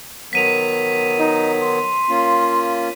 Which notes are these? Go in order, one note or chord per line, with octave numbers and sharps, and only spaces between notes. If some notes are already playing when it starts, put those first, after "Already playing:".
D#3 F#3 B3 B6 D#7 F7
D#4
C6
A#3 C#4 F4